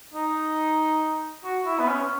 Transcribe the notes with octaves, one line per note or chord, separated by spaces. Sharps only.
D#4
F#4
E4
B3
C#4